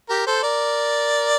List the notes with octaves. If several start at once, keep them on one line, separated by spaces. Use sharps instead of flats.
G4 A#4
A4 C5
A#4 D5